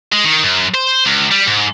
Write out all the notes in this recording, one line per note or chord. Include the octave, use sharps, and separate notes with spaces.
G#3
D#3
F#2
C5
C#2
G3
G#2